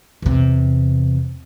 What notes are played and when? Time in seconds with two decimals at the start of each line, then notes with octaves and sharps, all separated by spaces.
0.22 E2 C3